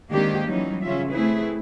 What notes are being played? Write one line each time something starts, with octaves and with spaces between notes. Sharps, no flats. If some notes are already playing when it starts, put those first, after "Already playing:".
D#3 G#3 A#3 C4 D4 G4
E3 F#3 G3 C#4 D#4
C#3 C#4 F4 E5
A3 C4 E4 G#4 B4